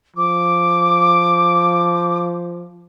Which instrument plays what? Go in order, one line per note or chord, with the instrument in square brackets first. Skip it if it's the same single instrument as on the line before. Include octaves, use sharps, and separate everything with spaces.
[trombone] F3 [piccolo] D6